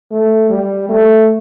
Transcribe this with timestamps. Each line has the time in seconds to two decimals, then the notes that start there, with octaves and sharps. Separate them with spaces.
0.11 A3
0.49 G3
0.89 A3